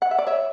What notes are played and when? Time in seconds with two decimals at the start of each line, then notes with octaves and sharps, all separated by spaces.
0.02 F#5
0.11 E5
0.18 D5
0.27 C#5 E5